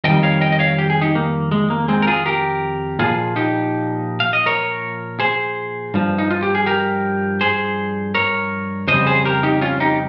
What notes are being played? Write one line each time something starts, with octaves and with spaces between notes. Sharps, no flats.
F2 D#3 G3 D#5 G5
C#5 F5
D#5 G5
D#5
C#5 F5
G4
G#4
D#4 G4
A#3
G#3
A#3
G#3 C4
A#4
F4 G#4
G4 A#4
A#2 F3 F4 G#4
D#4 G4
F5
D#5
A#4 C#5
G#4 C5
G2 F3
D#4
F4
G4
G#4
G4 A#4
G#4 C5
A#4 C#5
F2 C#3 G3 C5 D#5
G#4 C5
G4 A#4
D#4 G4
C#4 F4
D#4 G4